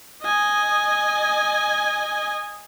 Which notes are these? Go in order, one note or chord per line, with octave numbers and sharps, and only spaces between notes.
D#5 G#5